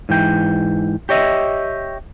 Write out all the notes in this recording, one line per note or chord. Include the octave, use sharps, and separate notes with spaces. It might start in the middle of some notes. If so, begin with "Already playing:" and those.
G#2 E3 G5
G4 C#5 D#5 E5